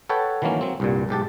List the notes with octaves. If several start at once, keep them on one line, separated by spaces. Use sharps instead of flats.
A4 B4 C#5 F#5 G5
D#3 E3 F#3 A#3 C#4
F#3 C4
C2 G2 A#2
B1 G#2 G4 A5